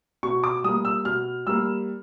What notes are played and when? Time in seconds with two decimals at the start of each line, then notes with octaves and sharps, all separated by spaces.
0.23 B2 C#6
0.44 D6
0.64 G3 A#3 D#6
0.85 E6
1.05 B2 F6
1.47 G3 A#3 E6